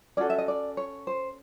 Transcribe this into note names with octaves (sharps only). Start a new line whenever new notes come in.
C#4 F#4 A4 D5
E5
D#5
D5
C#5
C5